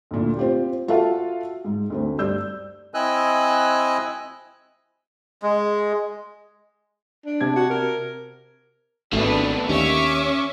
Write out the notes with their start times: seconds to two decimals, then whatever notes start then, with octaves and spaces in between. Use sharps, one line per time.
0.11 D2 A#2
0.37 C4 F4 G4
0.88 F4 F#4 A4 E5 F5
1.65 G#2
1.90 D2 A3 C4
2.18 G2 D5 E6 G6
2.94 C4 E4 D#5 G#5 E6 F#6
5.42 G#3
7.26 D4
7.41 C3 A5 G#6
7.56 F#4
7.70 A#4
9.13 G#1 B2 A3 D4 B4
9.69 D#2 C#4 E5 C#6 D6